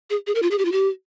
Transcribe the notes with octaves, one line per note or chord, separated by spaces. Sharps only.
G#4
G#4
A#4
F4
G#4
G4
F4
G4